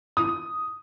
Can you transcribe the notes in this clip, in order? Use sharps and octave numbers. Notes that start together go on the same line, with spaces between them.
D#6